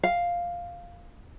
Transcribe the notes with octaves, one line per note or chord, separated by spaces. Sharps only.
F5